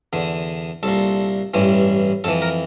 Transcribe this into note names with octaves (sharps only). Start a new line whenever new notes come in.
E2 D3
C2 A#2 A4
A1 G2 E3
F2 E3 A4
A#4